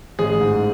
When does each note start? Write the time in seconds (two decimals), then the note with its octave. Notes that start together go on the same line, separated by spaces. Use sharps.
0.19 A1 G#4
0.41 G#2